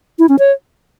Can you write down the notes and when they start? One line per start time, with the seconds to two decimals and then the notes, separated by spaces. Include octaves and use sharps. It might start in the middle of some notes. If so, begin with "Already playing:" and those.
0.19 E4
0.29 C#4
0.39 C#5